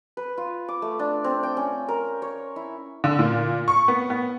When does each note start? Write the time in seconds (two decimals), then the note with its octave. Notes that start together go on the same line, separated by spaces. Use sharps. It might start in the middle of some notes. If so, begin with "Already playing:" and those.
0.17 B4
0.38 F4
0.68 D6
0.82 A3
0.99 D4
1.24 C4
1.43 G5
1.57 C#4
1.88 A#4
2.22 C#5
2.56 E4
3.04 D3
3.19 A#2
3.68 C#6
3.88 B3
4.10 B3